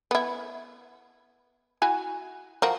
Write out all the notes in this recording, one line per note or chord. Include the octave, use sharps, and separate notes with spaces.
B3 E4
E4 F#4 G#5
F3 F#4 A#4